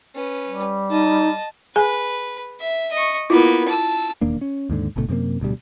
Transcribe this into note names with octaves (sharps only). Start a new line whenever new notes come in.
C#4 B4
G3
D#4 D#5 A5
G#4 B4 G#5
E5
D#5 C#6
A#3 B3 E4 F4
A5 E6
E1 D#2 A#3 D4
C#4
D#2 G#2 D3
G1 D2 B2 A3
F#2 C3 G#3 A#3
D1 D2 B2 G3